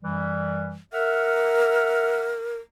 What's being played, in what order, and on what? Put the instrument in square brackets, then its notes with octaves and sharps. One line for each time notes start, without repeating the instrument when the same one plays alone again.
[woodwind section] F#2 E3 G3
[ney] A#4 [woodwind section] E5 F#5 F6